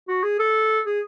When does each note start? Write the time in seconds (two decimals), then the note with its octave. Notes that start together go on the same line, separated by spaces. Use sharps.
0.08 F#4
0.23 G#4
0.39 A4
0.86 G#4